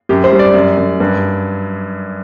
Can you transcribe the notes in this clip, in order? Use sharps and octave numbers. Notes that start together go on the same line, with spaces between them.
F#2 G4
C5
G3
D5
F#2
F#2
G2